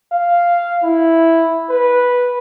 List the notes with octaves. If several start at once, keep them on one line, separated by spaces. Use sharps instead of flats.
F5
E4
B4